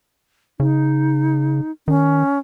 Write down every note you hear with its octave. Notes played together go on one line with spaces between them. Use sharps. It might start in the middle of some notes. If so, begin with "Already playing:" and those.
C#3 D#4
D#3 C#4